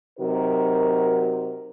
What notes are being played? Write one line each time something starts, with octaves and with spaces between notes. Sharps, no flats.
C3 F#3 D#4 F#4 A#4